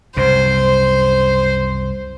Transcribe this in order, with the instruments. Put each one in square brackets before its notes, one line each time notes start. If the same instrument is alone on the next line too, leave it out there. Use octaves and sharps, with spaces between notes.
[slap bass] C2 F#2 C#3 [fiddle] C5